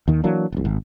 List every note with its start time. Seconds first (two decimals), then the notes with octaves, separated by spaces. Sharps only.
0.08 D#2 D#3
0.24 E3 F#3 A#3 D4
0.52 F1 C2
0.65 G#1